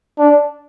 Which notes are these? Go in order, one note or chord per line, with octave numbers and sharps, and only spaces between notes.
D4